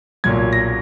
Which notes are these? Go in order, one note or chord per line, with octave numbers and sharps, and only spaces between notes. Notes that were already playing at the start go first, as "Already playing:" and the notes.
B1 A#2 F#3 G#6
A#6